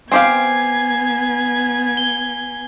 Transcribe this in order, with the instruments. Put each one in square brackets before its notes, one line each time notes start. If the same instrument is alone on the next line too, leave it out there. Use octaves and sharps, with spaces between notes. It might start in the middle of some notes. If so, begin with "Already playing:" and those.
[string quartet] B3 G#6 [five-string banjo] C4 G4 F5 [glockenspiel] G#5 C7
[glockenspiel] G7